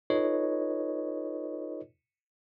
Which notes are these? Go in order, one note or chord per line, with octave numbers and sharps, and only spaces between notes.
D#4 F4 A4 B4 C#5 D#5